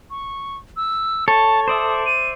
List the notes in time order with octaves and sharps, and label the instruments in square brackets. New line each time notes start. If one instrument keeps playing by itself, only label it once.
[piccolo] C#6
E6
[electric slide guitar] A4 [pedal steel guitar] C#5 [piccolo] A5
[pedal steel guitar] C5 D5 E5 [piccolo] D#6
[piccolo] D#7